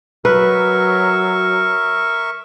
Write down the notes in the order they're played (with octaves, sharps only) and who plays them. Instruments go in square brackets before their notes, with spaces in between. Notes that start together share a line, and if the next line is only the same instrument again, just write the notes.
[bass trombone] F#3 [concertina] A#4 E5 C#6 [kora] B4